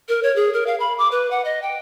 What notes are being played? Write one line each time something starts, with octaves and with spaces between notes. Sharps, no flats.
A#4
C#5
G#4
A#4
F5
B5
D6
B4
F#5
D#5
G5